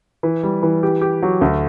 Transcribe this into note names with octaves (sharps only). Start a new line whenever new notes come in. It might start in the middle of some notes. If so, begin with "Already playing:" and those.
E3
G3
E3
G4
G4
F#3
D2